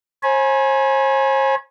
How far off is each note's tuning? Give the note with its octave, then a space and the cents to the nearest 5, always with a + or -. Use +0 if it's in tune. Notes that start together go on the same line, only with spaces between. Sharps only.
C5 +45 G#5 +15 B5 -35